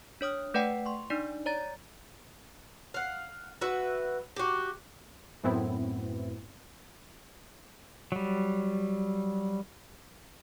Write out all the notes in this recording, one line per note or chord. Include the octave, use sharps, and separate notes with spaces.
D4 C#5 D#6 F6
A3 B4 D5 F#5 G5
C6 C#6
D4 D#4 D5
C#5 D5 A#5 A6
F5 F#5
F#4 B4 E5
F#4 G4
F#2 A2 B3 C4 E4
F#3 G3